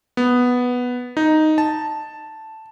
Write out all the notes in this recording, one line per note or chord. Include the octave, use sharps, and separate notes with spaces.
B3
D#4
A5